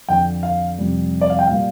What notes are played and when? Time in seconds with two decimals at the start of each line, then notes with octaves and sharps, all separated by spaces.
0.08 F2 D3 F3 G5
0.43 F5
0.78 F2 C3 G3
1.21 D5
1.30 F5
1.39 G5
1.47 A#2 G3 F5